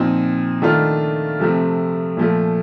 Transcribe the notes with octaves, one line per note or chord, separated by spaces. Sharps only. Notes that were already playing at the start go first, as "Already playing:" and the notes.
Already playing: A#2 F3 C4 D#4
D#3 A3 D4 F4
C3 F3 A3 C4
A#2 F3 A3